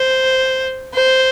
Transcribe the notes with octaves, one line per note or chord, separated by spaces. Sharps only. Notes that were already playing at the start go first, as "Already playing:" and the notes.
Already playing: C5
C5